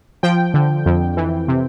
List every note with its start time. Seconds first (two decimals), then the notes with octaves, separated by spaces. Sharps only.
0.23 F3 G5
0.54 D3
0.86 F2
1.17 E3
1.48 C3